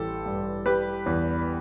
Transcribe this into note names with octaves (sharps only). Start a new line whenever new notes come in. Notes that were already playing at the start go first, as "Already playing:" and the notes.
Already playing: A1 G3 G4 A4
G2
G3 G4 B4
E2